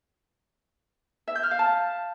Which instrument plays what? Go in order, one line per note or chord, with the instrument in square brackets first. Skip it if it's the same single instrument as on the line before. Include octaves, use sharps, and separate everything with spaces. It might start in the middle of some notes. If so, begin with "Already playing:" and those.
[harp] E5
G6
F6
F5
A5